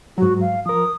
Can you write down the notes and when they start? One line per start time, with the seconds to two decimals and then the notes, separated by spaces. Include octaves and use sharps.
0.18 G#2 F#3 F#4
0.41 F5
0.66 F3 A#4 D#6